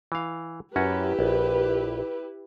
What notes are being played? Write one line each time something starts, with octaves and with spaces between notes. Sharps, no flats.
E3 F5
F#2 C#4 E4 F#4 G4 B4
A#1